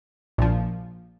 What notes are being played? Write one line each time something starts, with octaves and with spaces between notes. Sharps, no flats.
A#1 A#2 F3